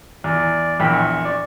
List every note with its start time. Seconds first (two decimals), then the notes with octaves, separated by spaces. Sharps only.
0.24 E2 D5
0.80 A#1 E2 G5 B5
0.93 C#6
1.25 D5